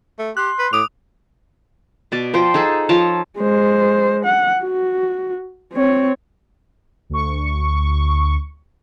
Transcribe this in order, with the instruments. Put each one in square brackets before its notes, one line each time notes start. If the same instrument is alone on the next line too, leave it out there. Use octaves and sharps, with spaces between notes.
[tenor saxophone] A3
[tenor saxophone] G4 [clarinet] C6 [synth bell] F#6
[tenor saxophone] B4
[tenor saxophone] A2 [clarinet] D6 [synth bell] D#6 F7
[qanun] B2 D5 A5
F3 C5 G5
D#4 G#4 A4
F3 C#5 A5
[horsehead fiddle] G#3 C5
F#5
F#4
C4 C#5
[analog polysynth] D2 C#6